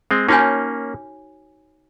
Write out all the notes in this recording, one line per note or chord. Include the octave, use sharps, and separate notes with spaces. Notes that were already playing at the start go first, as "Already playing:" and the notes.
G#3 C4
A#3 C#4 D#4 F#4 C#5 G#5